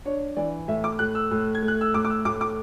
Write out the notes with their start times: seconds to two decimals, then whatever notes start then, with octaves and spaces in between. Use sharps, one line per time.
0.05 D4 C#5
0.36 E3 D5
0.68 A2 E5
0.84 D6
0.99 A2 F#6
1.15 E6
1.31 A2
1.55 G#6
1.62 A3
1.68 F#6
1.81 E6
1.94 A2 D6
2.05 D6
2.10 E6
2.25 A2 D6
2.41 D6